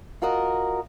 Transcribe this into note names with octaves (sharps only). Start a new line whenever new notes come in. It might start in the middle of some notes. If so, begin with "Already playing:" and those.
F4 F#4 A#4 D#5